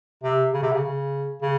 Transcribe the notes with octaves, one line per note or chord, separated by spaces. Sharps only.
C3
C#3
C3
C#3
C#3
C#3